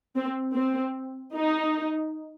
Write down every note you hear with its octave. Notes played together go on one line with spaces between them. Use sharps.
C4
C4
D#4